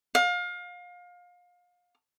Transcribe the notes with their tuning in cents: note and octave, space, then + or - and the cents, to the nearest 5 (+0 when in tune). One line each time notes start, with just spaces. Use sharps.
F5 +30